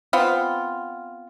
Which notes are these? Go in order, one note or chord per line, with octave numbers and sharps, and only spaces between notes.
B3 C4 F4